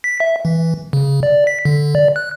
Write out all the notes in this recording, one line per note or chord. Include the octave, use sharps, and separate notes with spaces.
B6
E5
E3
C#3
D5
B6
D3
D5
F#6